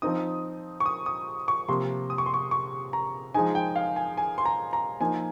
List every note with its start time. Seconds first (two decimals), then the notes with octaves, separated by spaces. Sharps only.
0.02 F3 C4 D#4 D#6
0.80 C#6
0.86 D#6
1.06 D#6
1.48 C#6
1.68 C3 F3 A#3 C6
2.10 D#6
2.18 C#6
2.26 C6
2.34 C#6
2.51 C#6
2.93 A#5
3.34 F3 G#3 D#4 G#5
3.55 G5
3.76 F5
3.96 G#5
4.17 G#5
4.38 C6
4.46 A#5
4.73 A#5
5.00 F3 A#3 D#4 G#5